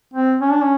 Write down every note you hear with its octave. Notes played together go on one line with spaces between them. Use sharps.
C4
C#4
D4
C#4